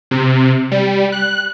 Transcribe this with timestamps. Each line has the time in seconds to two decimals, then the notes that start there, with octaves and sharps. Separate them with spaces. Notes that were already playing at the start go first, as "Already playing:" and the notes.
0.11 C3
0.71 G3
1.12 F#6